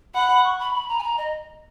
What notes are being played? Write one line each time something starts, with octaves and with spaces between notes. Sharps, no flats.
F#5 B5
C#6
B5
B5
A#5
G#5
A#5
D#5